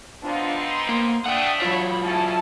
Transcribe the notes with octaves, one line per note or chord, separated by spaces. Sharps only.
B3 C4 D4 D#4 F4
C6
A#3
A3 D4 F#5 G5 D#6
F#3 F4 C#5 B5
C#3 G3 C#4 E4 A5